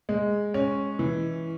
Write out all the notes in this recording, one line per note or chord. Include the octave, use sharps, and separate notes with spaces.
G#3
C#4
E3